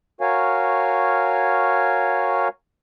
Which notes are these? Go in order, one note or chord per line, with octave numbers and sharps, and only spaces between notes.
F#4 A#4 C#5 F5 G#5